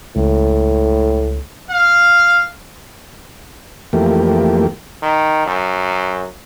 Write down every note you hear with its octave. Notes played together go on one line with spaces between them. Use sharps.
C#2 A2
F5
F2 E3 A3 A#3 G4
D#3
F#2